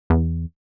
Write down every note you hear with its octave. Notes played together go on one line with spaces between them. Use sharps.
E2